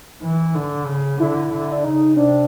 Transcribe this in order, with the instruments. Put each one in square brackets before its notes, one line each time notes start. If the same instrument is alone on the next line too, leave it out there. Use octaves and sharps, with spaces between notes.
[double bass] E3
D3
C#3
[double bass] D3 [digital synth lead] E4
[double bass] D3
[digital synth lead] D4
[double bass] C#3 [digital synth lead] D#4
[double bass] C3 [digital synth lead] D4